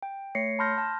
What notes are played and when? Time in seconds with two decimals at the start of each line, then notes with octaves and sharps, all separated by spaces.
0.03 G5
0.35 A3 C#5 A#6 C7 C#7
0.59 A5 B5 C6 F6 G6 A#6
0.78 A5